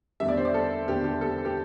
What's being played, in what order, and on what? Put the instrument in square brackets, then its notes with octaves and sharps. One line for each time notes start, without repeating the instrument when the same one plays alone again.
[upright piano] E2 D3 G3 E5
D5
C5
D5
A4
E2 D3 G3 G4
G4
A4
G4